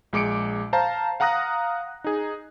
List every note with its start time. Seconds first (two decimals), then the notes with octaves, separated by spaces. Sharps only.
0.13 A#1 G#3 D6 C#7 D7
0.73 C5 F5 A5 A#5
1.20 F5 F#5 A#5 D#6 F#6 A#6
2.04 D#4 G#4